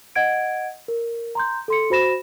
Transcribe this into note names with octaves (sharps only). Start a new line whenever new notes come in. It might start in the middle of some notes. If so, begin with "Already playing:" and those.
D#5 F#5 G#6 D7
A#4
A#5 C6 G6
A4 C6 C#7
F#4 C5 B5 A#6 E7